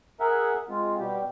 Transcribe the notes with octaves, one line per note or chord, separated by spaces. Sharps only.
G#4 A#4 E5 F#5
G#3 C4 F4
B2 G3 G4